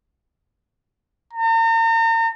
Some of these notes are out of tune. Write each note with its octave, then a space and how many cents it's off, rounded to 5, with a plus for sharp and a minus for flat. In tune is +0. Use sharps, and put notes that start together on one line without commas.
A#5 -40